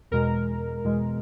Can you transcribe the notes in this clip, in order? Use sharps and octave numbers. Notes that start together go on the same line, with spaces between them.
E2 B2 G#3 A#4
E2 B2 G#3